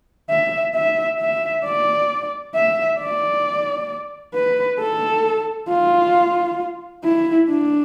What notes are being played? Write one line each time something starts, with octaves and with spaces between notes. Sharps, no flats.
E5
E5
E5
D5
E5
D5
B4
A4
F4
E4
D4